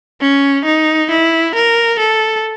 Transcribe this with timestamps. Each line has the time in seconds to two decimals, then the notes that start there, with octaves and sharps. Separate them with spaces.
0.21 C#4
0.65 D#4
1.11 E4
1.55 A#4
1.99 A4